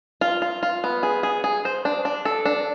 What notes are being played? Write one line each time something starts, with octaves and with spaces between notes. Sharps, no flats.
F4
F4
F4
B3
G#4
G#4
G#4
C5
D4
D4
A4
D4